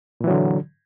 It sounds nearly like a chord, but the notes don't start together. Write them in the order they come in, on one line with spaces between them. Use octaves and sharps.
A#2 E3 F#3 D3